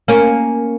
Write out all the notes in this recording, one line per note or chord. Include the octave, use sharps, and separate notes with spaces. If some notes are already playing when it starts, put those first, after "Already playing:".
A#3 C#4